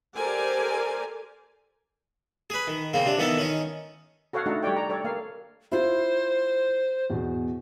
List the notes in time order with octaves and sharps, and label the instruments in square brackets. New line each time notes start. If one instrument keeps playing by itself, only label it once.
[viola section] G4 A4 A#4 C5 D5 G#5
[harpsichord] G#4 B4
D#3
C#3 A#3 C4
C3 D4
D#3 E3 B3 D#4 A4
D#3 C#4 D#4
[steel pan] F#4 A4 C#5 F5 F#5
A3 D4 D#4 F#4 A4
G3 G4 C#5 D5 G5
A#5
A4 C#5 D5
A#3 F5
[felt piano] E4 F4 [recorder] C5
[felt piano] E2 B2